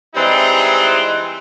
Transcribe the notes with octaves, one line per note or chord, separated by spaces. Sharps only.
E3 G3 G#3 C4 D#4 E4